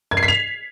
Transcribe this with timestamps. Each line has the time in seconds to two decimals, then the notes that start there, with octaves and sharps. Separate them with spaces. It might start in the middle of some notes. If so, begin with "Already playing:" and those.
0.11 G#6
0.17 C7
0.23 B6
0.28 F7